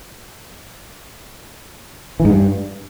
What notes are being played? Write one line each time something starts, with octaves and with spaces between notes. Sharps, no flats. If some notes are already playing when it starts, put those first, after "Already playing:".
E3
G#2
G2